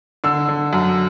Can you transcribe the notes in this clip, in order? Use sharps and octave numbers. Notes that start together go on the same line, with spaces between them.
D3 E6
D3
F#2